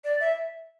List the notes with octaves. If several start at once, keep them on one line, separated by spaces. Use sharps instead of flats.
D5
E5